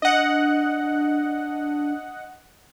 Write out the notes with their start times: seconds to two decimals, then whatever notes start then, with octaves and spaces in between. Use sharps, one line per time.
0.02 D4 D#5 F#5